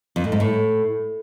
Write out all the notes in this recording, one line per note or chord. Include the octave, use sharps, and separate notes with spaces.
F2
A2
G#2
A2